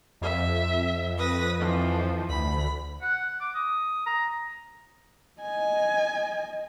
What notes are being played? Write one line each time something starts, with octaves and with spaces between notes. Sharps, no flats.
F2 E5
B4 D#6 A#6
E3 F3
D2 B5
F#5
D6
D#6
A#5
D#5 G#5